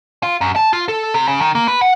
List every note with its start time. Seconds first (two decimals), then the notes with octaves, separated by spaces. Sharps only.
0.23 F4
0.41 F#2
0.56 A5
0.73 F4
0.88 A4
1.14 C3
1.28 C#3
1.41 D#3
1.55 A#3
1.68 B4
1.81 F#5